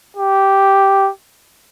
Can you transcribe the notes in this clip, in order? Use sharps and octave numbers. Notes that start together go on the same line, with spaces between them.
G4